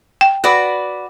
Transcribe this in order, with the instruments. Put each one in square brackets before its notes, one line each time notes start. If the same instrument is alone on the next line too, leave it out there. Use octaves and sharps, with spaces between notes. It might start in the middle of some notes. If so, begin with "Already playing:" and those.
[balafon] G5
[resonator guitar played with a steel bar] F#4 B4 D5